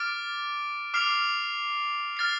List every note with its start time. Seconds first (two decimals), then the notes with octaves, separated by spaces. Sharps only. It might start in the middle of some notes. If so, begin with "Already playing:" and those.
Already playing: D6 F6 A6 D7
0.94 D6 F6 C7 F7
2.17 F6 A6 C7